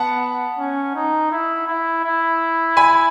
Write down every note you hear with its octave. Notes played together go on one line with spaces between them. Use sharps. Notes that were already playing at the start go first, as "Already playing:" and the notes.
Already playing: B3 F#5 A5
C#4
D#4
E4
E4
E4
G#5 B5